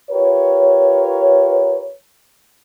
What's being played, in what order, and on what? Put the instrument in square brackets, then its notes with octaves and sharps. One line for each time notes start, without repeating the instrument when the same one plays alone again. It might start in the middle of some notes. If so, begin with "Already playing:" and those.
[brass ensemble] F4 G4 A#4 B4 C#5